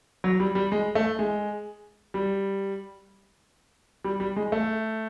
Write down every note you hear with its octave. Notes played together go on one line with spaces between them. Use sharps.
F#3
G3
G3
G#3
A3
G#3
G3
G3
G3
G#3
A3